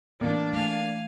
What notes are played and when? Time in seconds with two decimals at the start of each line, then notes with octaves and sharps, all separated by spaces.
0.21 A2 E3 A3 A#3 D4 D5
0.53 A3 F5 G#5